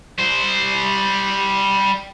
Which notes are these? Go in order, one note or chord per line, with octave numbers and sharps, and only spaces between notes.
G3 C5